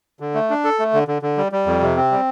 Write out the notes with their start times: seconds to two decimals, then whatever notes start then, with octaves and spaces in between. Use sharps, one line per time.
0.20 D3
0.34 A3
0.50 D4
0.64 A4
0.79 A3
0.94 D3
1.08 D3
1.22 D3
1.38 G3
1.52 G3
1.66 F2
1.82 C3
1.97 C4
2.11 G3